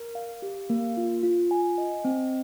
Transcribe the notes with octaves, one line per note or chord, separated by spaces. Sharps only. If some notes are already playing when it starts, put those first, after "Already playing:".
Already playing: A#4
F5
G4
A#3
F4
F4
G#5
D#5
C4